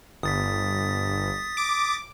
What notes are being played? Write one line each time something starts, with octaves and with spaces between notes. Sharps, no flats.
G1 D#6 A6 B6
D6